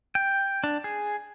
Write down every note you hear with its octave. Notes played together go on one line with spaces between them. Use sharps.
G5
D4
G#4